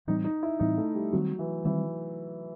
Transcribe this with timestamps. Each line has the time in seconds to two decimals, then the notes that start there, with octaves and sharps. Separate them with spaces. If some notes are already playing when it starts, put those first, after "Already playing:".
0.07 A2 E3 G3 C4 D#4
0.24 D#4
0.43 E4
0.59 A2 E3 G3 C4 D#4
0.78 A3
0.95 G3
1.13 D#3 F#3 G3 C4
1.39 E3
1.65 D#3 E3 G3 C4